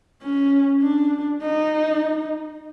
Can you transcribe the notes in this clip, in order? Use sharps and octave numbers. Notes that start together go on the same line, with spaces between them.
C#4
D4
D#4